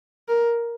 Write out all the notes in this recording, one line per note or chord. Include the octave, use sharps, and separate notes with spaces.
A#4